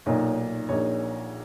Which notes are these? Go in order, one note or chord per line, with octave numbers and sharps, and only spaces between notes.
B1 A#2 A#3 D#4 C#5
A#1 A#2 A#3 D#4 C#5